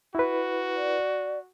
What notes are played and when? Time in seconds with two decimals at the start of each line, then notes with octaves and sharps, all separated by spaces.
0.15 E4 F#4 B4
0.76 D5